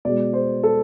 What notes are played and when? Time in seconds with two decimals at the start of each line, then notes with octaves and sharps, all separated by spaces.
0.05 B2 G#3 D5
0.33 C5
0.63 A4